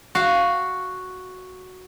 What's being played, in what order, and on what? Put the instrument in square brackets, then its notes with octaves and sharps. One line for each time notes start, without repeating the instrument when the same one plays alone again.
[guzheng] F#4 F5